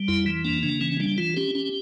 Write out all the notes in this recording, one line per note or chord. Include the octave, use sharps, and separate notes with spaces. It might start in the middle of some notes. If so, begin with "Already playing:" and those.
Already playing: G3
F2 E4
E3
A#3 D4
C#3 D4
E3 C#4
G3 D4
E3 F4
C#4 G4
C#4